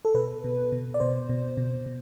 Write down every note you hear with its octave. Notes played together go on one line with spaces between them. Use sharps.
A4
B2 B4
B2
B2
D5
B2 C5
B2
B2
B2